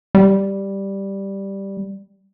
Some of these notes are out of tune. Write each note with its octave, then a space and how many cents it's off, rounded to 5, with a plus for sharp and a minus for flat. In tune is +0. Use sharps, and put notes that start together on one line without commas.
G3 +0